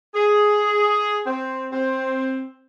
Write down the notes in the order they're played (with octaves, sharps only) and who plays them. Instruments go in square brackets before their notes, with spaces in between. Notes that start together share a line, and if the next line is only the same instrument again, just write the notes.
[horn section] G#4
C4
C4